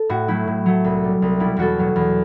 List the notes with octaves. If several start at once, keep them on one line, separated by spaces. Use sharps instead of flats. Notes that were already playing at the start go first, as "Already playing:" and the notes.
Already playing: A4
A2 F#4
F#3 A3 E4
A2
F#3 A3
C2
B2 G3
C2
B2 G3 E4
E2 F#4 A4
B2 F#3 A3
E2